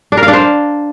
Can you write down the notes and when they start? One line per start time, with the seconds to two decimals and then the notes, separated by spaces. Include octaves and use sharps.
0.12 D4
0.17 A#4
0.23 F5
0.28 D4
0.33 C5